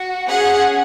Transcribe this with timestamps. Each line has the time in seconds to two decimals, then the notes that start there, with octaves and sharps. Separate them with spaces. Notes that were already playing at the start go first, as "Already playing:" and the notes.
Already playing: F#4
0.26 C#4 G#4 F#5